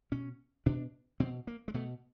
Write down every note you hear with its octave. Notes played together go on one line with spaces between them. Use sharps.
B2 C#4
B2 D4
B2 C4
A#3
G#3
B2 A3